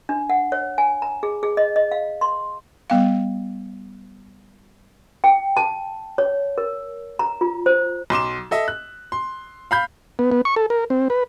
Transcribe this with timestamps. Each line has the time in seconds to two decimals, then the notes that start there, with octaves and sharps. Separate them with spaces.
0.09 D4
0.30 F#5
0.52 C#5
0.78 G#5
1.02 A#5
1.23 G#4
1.43 G#4
1.57 D#5
1.76 D#5
1.92 F5
2.21 C6
2.90 G3 B3 F5
5.24 G5
5.57 A5
6.18 C#5
6.58 A#4
7.19 A#5
7.41 F4
7.66 C5
8.10 B1 C6 D6 E7
8.51 A4 D#5 E5
8.68 F#6
9.12 C6
9.71 F5 B5 G6
10.19 B3
10.31 B3
10.45 C#6
10.56 A4
10.70 A#4
10.90 C4
11.10 B4